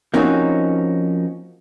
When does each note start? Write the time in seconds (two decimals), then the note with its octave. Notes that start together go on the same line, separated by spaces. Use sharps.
0.14 F3 A#3 C4 C#4 D#4 F#4